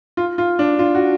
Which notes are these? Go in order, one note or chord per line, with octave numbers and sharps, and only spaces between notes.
F4
F4
D4
F4
F#4